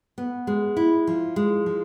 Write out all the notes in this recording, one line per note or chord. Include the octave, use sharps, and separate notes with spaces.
B3
G#3
E4
F3
G#3
F3